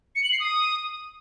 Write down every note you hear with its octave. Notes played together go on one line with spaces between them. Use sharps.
C#7
F#7
C7
D#6